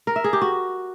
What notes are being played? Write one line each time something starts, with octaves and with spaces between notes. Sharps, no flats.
A#4
E5
G#4
G4
F#4